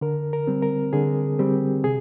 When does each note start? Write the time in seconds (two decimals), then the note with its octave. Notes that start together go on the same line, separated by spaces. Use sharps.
0.01 D3 A#4
0.33 A#4
0.47 G3 C4
0.62 A#4
0.93 D3 G#4
1.39 G3 C4 G4
1.84 C3 G#4